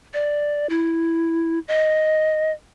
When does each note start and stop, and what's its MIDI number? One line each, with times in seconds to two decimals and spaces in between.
0.14 0.69 74
0.70 1.59 64
1.68 2.51 75